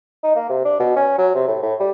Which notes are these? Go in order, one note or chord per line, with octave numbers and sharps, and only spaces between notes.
D#4
A#3
C3
D4
B2
C#4
F#3
C3
A2
A2
G3